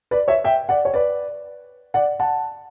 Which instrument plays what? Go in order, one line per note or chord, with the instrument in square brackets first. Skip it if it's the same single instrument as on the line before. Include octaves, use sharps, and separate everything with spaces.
[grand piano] B4 D5
C#5 E5
E5 G5
D5 F#5
C#5
B4 D5
D5 F#5
F#5 A5